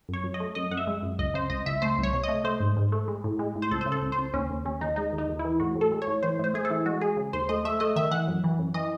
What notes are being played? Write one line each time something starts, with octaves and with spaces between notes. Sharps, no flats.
F#2 C#5
F#2
D#5
A3
F#2 D#5
F#2 F#5
E5
G#3
F#2
C#2 D#5
C#3 C5
C#2 D#5
C#2 E5
A3 C5
C2
C#5
C3
A3 D#5
A3 C5
G#2
G#2
A3
G#3
A2
G#3
A2
C5
C#2 A4
C#3 C5
A4
C#2
C5
C#2
D#2 C#4
D#2
D#2 C#4
D#2 D#4
G#3 D#4
D#2
D#4
D#2
E4
E3
A2 F#4
A2
A4
G#3
C#5
A2
E3 C5
A2 C5
A3 G#4
A4
E3
G#3 F#4
G#3 G#4
C#3
D#2 C5
A3 D#5
A3 E5
A3 D#5
D#3 E5
E3 F#5
F#2
E3
F#2
E3 D#5